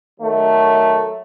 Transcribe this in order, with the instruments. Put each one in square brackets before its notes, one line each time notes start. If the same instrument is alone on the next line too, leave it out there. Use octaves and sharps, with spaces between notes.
[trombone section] D#3 F#3 A3